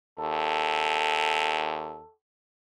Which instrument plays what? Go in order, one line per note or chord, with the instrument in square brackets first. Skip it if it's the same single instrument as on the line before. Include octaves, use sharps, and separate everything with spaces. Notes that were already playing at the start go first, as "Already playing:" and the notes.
[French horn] D#2 [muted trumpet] A4